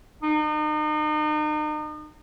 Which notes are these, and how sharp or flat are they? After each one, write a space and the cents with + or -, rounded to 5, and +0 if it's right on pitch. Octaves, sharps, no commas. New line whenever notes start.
D#4 -35